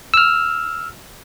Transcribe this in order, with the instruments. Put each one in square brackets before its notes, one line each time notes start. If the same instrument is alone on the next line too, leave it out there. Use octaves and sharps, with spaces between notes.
[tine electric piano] E6 F6